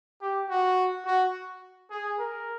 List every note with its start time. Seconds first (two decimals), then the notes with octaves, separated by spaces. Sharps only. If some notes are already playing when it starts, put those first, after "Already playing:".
0.22 G4
0.49 F#4
1.06 F#4
1.91 G#4
2.19 A#4